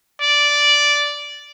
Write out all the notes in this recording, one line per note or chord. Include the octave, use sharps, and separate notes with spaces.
D5